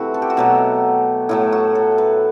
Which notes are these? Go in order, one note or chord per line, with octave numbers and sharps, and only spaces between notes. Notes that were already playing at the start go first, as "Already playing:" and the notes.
Already playing: C3 E3 A3 C4 E4 F#4
A4
G4
F#4
B2 F#3 A3 G4
A2 F#3 A3 E4
F#4
A4
B4